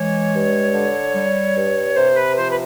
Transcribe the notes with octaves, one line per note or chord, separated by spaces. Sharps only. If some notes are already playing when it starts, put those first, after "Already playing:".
Already playing: E3 G#3 C#5
G2
D3
G3
G2
C3 C5
B4
F3 C5
B4